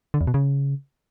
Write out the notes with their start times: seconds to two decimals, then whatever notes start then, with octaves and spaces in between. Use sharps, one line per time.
0.14 D3
0.21 E2
0.27 B2
0.34 C#3